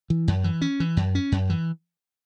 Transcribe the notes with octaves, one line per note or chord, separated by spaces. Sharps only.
E3
F#2
E3
C#4
E3
F#2
C#4
F#2
E3